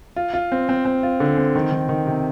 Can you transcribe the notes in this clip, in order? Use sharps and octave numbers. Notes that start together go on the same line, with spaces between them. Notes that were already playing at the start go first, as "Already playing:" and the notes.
F4
F4
C4
C4
C4
F4
D3
C4
D#3
D#3
D#3
C3